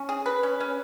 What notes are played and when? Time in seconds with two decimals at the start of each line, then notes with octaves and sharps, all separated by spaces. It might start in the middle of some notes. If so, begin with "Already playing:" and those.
Already playing: C#4
0.09 G#4
0.26 B4
0.43 C#4
0.60 C#4